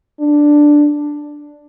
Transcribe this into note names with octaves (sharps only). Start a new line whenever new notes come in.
D4